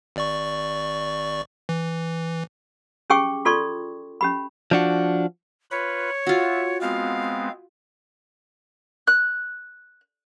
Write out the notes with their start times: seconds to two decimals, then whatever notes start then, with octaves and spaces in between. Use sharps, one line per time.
0.16 G#1 D5 C#6
1.69 E3
3.10 C#4 G4 G#4 G5 C#6 D6
3.45 F4 A4 D5 C6 C#6
4.21 C#4 G4 B5
4.71 F3 D4 F#4
5.71 F4 B4 C#5 B5
6.27 F4 F#4 E5
6.81 G#3 B3 C4 F5
9.07 F#6